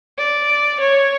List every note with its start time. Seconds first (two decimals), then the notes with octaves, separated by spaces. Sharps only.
0.18 D5
0.79 C#5